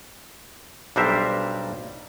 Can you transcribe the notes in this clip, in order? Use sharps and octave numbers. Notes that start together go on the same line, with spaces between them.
B1 G3 D4 A#4 C5 E5